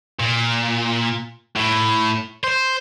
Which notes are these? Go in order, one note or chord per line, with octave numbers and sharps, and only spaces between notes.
A#2
A2
C5